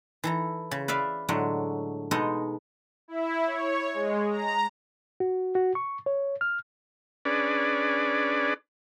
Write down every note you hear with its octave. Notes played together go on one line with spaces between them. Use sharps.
E3 A4 A#5
C#3
B4 D5 E5 F5
A2 D3 F#3 G#3
B2 G#3 D#4 A4 D#5
E4
C#5
G#3
A#5
F#4
F#4
C#6
C#5
F6
C#4 D4 G#4 B4 D5